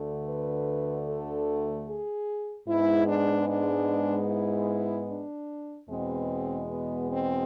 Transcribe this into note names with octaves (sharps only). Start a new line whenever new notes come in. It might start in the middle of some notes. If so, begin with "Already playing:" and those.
Already playing: D2 D3 A3
B4
A4
G#4
G#2 G#3 B3 E4
D4
D4
E4
D4
E2 B2 G#3 B3 C4
B3
C4